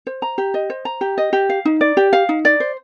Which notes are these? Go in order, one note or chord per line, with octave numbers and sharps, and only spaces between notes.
C5
A#5
G4
D#5
C5
A#5
G4
D#5
G4
F5
D#4
D5
G4
F5
D#4
D5
C5